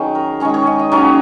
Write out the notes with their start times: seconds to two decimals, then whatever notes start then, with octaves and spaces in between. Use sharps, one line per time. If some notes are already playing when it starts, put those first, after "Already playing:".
Already playing: D#3 F#3 C#4 G#4
0.15 A#4
0.40 D#3 G#3 C#4 C#5
0.54 C#5
0.67 D#5
0.79 D#5
0.92 D#3 F#3 A#3 C#4 C#5